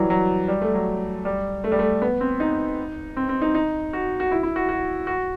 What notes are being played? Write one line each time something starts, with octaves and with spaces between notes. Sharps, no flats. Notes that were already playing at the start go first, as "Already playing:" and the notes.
Already playing: E3 F#3 G3
F#3
G3
A3
F#3
G3
A3
G3
A3
B3
C4
D#4
C4
C4
D#4
D#4
F#4
F#4
E4
E4
F#4
F#4
F#4